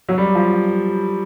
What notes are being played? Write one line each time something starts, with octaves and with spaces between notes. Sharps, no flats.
F#3
G3
F3